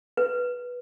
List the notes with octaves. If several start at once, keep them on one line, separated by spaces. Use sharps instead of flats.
B4